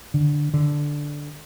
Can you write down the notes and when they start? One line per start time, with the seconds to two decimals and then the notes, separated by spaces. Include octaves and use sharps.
0.14 D3
0.54 D3